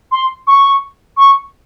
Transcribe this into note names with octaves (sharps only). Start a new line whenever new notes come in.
C6
C#6
C#6